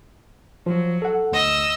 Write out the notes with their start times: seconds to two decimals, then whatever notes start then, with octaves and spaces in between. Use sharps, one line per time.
0.66 F3 F#3
1.02 A4 F#5
1.32 D2 D#5 E6